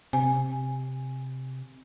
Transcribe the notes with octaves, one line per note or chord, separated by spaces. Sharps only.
C3 G#5